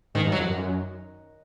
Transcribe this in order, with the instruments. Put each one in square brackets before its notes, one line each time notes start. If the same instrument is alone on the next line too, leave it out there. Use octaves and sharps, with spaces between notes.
[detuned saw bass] G#2 [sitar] D#3
[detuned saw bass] G2
[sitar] F#3
[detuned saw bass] F2
F#2